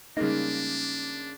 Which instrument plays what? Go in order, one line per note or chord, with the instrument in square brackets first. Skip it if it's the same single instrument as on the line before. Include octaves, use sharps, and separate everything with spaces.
[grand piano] C#3 G#3 A#3 [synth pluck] G3 D#4 [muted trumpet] D4